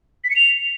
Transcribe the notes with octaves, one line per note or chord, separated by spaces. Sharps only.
B6
C#7
F7